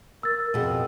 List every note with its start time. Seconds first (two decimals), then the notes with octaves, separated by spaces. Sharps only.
0.23 A#4 E6 A6
0.54 F2 B2 G#4